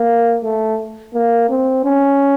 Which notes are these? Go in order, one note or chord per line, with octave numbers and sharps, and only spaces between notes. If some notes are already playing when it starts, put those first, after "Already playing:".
Already playing: A#3
A3
A#3
C4
C#4